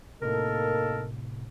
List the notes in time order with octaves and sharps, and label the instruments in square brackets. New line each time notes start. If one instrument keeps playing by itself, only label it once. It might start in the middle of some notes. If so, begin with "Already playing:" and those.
[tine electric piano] A2 C3 [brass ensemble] A#3 D#4 A4 [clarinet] A#4